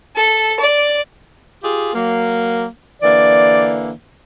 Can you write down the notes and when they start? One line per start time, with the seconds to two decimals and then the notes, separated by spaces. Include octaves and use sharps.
0.16 A4
0.59 D5
1.61 F4 G4 G#4
1.93 F#3 A#3
3.02 D3 E3 A#3 D5